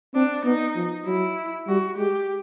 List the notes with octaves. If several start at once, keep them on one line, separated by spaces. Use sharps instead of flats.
C4 D4
B3 D#4
F3
F#3 E4
G3 F#4
G#3 G4